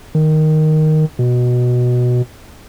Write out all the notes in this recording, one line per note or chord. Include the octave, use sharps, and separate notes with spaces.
D#3
B2